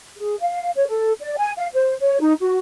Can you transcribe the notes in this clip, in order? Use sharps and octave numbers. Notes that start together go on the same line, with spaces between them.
G#4
F5
C#5
A4
D5
G#5
F5
C5
C#5
D#4
F#4